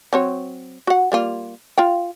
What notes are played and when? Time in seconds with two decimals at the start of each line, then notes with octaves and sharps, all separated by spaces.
0.13 F#3 C4 C#5
0.87 F#4 F#5
1.12 G3 A#3 F4
1.78 F4 F5 G5